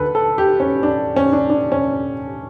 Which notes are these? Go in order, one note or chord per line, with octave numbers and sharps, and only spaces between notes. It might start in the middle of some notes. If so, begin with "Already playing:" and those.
Already playing: D2 D3 A4 B4
A4
G4
C#4
D4
C#4
D4
D4
C#4